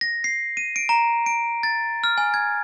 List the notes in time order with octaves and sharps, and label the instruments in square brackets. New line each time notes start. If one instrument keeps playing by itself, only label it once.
[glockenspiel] A#6
C7
D#7
D7
A#5
D7
A6
F6
G#5
G#6